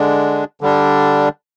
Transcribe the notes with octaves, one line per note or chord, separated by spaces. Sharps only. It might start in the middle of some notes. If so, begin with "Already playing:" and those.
Already playing: D3 G#3 D4
D3 G3 D4